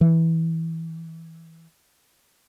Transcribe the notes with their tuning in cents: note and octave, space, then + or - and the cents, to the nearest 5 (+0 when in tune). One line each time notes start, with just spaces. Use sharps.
E3 -15